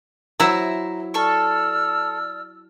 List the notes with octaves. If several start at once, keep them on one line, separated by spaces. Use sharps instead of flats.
F#3 E4 C5 E5 A#5
A4 D5 C#6 E6 F6